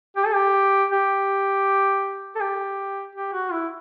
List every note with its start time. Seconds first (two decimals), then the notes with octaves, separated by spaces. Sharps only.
0.16 G4
0.26 A4
0.34 G4
0.91 G4
2.35 A4
2.41 G4
3.15 G4
3.33 F#4
3.52 E4